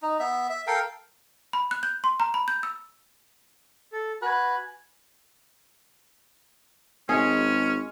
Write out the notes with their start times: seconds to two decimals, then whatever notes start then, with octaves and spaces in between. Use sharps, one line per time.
0.02 D#4
0.19 B3 E5
0.50 E5
0.67 A4 A#4 F5 G5
1.53 B5
1.71 F#6
1.83 G6
2.04 C6
2.20 A#5
2.34 B5
2.48 G6
2.63 E6
3.93 A4
4.22 F#4 B4 G#5 F#6 G#6
7.09 G#1 G#3 C#4 G#4